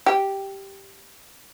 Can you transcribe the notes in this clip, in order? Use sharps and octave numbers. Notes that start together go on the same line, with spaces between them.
G4